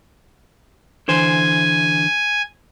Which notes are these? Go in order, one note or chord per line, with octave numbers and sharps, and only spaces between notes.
D3 E3 C5 G#5